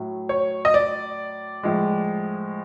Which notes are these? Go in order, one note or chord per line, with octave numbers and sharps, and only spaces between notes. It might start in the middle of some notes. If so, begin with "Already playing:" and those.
Already playing: A2 F#3
C#5
D#5
D5
A2 F3 G#3